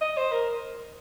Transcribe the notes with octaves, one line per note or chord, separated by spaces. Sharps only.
D#5
C5
A#4